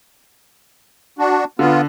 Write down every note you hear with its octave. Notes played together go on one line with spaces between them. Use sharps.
D4 F#4
D3 B3 F4